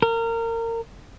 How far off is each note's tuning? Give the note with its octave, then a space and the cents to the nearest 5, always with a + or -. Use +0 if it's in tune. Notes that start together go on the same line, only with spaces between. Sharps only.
A#4 -25